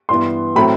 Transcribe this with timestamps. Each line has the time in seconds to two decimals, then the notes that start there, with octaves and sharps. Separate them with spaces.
0.09 G2 E3 B3 C6
0.55 A2 F#3 A3 C4 B5